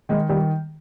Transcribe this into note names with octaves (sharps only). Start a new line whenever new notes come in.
D#3 G#3
D#3 G3